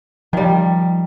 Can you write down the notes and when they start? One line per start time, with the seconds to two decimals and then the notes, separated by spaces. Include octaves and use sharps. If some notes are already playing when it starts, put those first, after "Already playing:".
0.33 D#3 F3 G3